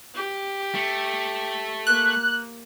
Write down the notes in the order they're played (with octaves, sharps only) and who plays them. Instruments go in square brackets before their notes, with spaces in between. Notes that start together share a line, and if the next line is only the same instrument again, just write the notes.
[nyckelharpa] G4
[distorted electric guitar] A3
[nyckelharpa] A#3 [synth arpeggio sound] F#6